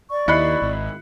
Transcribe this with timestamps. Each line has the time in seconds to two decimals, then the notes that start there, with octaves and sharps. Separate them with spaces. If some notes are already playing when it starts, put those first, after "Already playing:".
0.11 D5 C#6
0.28 D#2 E4 D#5 B5 F#6 C7 C#7
0.62 G#1